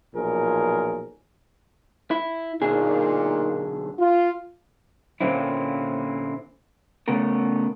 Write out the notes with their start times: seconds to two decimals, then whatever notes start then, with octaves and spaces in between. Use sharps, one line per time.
0.15 B1 A#2 F3 G#4 A#4
2.11 E4
2.62 B1 A#2 D3 D#4 G#4
3.99 F4
5.21 A#2 D3 A#3 C4 C#4 E4
7.08 C#3 A3 B3 A#4